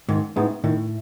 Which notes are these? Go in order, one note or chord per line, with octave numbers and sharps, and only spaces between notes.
G#2 D#3
A2 G#3 B3 D#4
A2 D#3